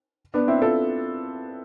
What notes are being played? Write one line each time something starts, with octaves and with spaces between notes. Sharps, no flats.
B3 D4
C4 E4
F4 A4